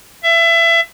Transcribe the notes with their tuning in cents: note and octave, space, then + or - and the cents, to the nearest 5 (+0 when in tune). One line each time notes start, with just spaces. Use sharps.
E5 +25